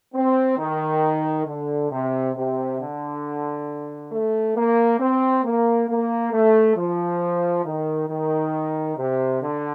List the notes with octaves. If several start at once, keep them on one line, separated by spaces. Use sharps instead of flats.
C4
D#3
D3
C3
C3
D3
A3
A#3
C4
A#3
A#3
A3
F3
D#3
D#3
C3
D3